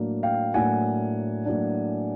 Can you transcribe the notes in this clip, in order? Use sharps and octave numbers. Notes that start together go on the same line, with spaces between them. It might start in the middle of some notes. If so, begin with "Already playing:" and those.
Already playing: A2 F#3 A#3 D4
F5 G5
A2 F#3 A#3 D4 F#5 G#5
A2 F#3 A#3 D4